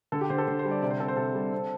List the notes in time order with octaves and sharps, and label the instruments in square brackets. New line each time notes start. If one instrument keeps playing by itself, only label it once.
[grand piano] D3 A4
G4
D3 C5
A4
D3 C5
C5
G3
D5
C3 D5
C5
C4 A4
C5
C3 A4
G3
C4